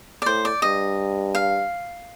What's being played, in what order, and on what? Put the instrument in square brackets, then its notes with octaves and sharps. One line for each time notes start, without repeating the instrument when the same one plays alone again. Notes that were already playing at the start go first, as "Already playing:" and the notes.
[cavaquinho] D5
[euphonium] A2 [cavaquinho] C5
[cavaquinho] D5
[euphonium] G2 [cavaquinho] D#5
[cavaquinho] F5